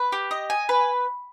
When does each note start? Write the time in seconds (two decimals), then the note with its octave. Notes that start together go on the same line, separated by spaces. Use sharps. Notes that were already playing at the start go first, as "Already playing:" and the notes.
Already playing: B4
0.12 G4
0.31 D#5
0.50 G#5
0.69 B4